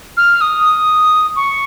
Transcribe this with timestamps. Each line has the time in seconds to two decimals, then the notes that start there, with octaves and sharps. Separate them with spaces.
0.17 F6
0.41 D#6
1.36 C#6